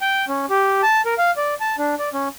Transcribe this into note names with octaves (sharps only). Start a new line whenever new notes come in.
G5
C#4
G4
A5
A#4
F5
D5
A5
D4
D5
C#4